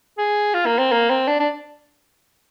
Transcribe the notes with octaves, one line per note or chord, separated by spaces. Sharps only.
G#4
F4
A#3
C4
A#3
C4
D4
D4